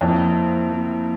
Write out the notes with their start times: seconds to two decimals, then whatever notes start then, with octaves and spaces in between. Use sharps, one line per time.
0.01 F2 F3 A#3 E4
0.73 F3 A#3 E4